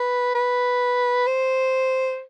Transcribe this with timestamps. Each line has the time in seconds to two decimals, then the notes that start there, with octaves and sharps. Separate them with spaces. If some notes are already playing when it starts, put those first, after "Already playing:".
Already playing: B4
0.35 B4
1.27 C5